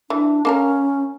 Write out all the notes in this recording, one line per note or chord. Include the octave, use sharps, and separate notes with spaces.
E3 D4
A#3 C#4 A4 A#4